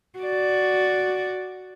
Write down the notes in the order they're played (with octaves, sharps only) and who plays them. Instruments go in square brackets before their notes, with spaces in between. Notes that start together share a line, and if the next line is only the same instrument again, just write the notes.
[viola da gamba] F#4 D5